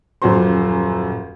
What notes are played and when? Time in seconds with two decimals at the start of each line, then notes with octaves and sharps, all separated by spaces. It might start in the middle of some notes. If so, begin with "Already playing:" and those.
0.22 D#1 F#2 F3 F#4 C5 C6